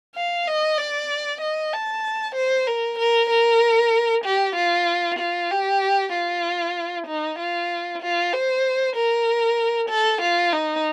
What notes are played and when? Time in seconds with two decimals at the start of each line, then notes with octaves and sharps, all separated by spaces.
0.15 F5
0.47 D#5
0.78 D5
1.41 D#5
1.73 A5
2.35 C5
2.67 A#4
2.99 A#4
3.30 A#4
4.25 G4
4.56 F4
5.19 F4
5.51 G4
6.13 F4
7.07 D#4
7.39 F4
8.02 F4
8.33 C5
8.96 A#4
9.89 A4
10.21 F4
10.53 D#4